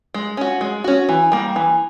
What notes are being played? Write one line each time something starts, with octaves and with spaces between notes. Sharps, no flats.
G#3
C#4 F#4
G#3
C#4 F#4
E3
G3 A#3
E3